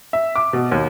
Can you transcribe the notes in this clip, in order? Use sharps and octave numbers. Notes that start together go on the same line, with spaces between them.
E5
D6
B2
D#2